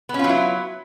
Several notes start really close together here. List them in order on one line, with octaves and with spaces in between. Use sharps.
B3 C#4 F4 F#3 E4